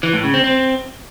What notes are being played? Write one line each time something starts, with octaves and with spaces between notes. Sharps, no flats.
E3
A2
C#3
C4
C4